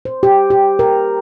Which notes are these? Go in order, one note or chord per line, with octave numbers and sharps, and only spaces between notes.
C5
G4
G4
A#4